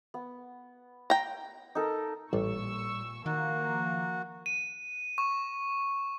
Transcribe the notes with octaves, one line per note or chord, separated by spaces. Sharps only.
B3
G5 A#5
D#4 A4 A#4
A1 A#2 G3 C#6 E6
D#3 F3 A#3 F#4
D#7
C#6